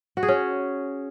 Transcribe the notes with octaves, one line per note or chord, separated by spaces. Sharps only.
F#4
G#4
C#4